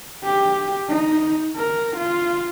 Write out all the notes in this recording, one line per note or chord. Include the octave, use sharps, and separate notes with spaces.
G4
D#4
A#4
F4